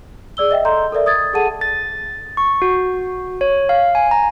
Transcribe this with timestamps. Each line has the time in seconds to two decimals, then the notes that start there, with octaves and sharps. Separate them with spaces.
0.37 G#4 D5 E6 G7
0.51 D#5 E5 G5
0.65 A4 D#5 A#5 C6 G6
0.92 A4 A#4 D5 E5
1.06 D#6 G#6 A6
1.33 G#4 A4 F#5 A5 D#7
1.61 A6
2.37 C#6
2.62 F#4
3.41 C#5
3.69 F5
3.95 G#5
4.11 A#5